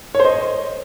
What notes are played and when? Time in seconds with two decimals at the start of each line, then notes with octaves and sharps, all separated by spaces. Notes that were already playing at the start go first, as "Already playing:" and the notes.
0.15 C#5
0.20 C5
0.25 D#5